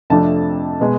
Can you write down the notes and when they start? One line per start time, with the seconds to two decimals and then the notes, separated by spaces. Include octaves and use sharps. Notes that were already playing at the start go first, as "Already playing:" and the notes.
0.10 F2 C3 F3 A3 D4 A5
0.81 B2 G#3